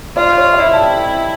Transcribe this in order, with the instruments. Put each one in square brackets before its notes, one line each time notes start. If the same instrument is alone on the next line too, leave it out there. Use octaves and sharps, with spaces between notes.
[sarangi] F4 [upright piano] D5
[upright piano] C#5
D5
[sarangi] E4 [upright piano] E5
[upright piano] A5
G5